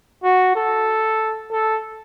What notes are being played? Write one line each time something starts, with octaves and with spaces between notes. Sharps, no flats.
F#4
A4
A4